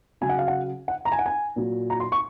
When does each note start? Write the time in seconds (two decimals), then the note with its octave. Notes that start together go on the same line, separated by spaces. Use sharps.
0.21 C#3 F#3 G#5
0.29 F#5
0.38 F5
0.48 F#5
0.88 F#5
1.05 A#5
1.12 G#5
1.19 F#5
1.26 G#5
1.56 A#2 F#3
1.90 A#5
2.00 C6
2.12 C#6